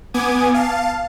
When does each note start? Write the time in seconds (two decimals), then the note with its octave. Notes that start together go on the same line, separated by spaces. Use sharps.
0.14 B3 G#5 D6 D#6 G#6
0.54 F5 A5